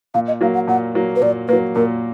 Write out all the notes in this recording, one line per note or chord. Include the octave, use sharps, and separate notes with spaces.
A#2 F5
D#5
F#3 A#3 F5
F#5
A#2 F#5
F#3 A#3
B4
A#2 D5
F#3 A#3 B4
A#2 A#4